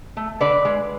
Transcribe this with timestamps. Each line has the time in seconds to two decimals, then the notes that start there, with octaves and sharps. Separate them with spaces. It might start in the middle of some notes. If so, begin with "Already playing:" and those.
0.17 A3
0.41 D3 B4 D5
0.65 G#3